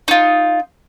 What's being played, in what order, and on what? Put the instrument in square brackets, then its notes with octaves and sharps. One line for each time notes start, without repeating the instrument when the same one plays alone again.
[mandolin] D#4 F4